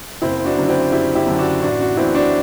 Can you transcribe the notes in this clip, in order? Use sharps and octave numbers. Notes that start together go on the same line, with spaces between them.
F#1 C4 E4
D4 F#4
F#2 D3
C4 E4
F#1 E4 G4
E4 G4
F#2 D3
D4 F#4
A1 D4 F#4
D4 F#4
A2 E3 C4 E4
D4 F#4